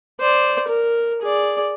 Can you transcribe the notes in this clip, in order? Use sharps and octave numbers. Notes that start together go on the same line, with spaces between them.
C5 D5
A#4
G#4 D5